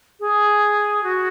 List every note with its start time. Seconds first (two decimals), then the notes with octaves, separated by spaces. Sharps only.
0.20 G#4
1.03 F#4